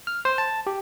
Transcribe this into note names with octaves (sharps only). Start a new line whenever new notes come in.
F6
C5
A5
G4